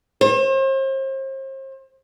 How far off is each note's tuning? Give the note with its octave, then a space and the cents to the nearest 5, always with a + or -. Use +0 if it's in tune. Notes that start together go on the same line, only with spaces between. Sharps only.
C5 +40